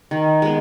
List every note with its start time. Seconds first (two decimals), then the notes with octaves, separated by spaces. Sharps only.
0.11 D#3
0.42 G#3 B3